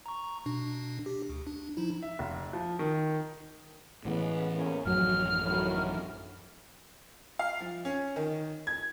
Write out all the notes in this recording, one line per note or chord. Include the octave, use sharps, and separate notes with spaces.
A#5 C#6
B2 D4
G4
D2
D4
F3 D#4 E4
E5
F1
F3
D#3
A2 C#3 E3 G#3 B3
E2 A#3 C#4
A1 F#2 F3 F#3 F6
A2 D#3 F#3
F5
F3
C#4
D#3
G#6